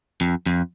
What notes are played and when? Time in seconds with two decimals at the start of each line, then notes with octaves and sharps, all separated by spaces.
0.21 F2
0.46 F2